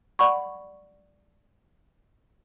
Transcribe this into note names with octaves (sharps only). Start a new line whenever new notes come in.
D5 F#5 B5 C#6